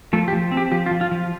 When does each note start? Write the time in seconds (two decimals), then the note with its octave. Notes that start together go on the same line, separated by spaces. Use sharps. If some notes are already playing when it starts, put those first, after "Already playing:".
0.13 F3 A3 A4
0.28 G4
0.33 F3
0.52 C4
0.57 G4
0.72 F3 G4
0.86 F4
0.91 F3
1.01 F4
1.11 F3